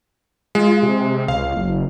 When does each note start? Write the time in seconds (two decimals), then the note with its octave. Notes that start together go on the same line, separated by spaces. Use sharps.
0.55 G#3 F4
0.83 C3
1.28 C#2 F5
1.57 F#1